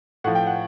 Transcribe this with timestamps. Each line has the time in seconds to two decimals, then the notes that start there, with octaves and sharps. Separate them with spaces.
0.24 A2 F3 F#5
0.35 G5
0.47 F#5